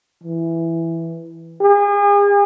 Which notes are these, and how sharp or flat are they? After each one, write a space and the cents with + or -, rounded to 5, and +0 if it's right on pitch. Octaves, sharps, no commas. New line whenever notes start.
E3 +5
G#4 -40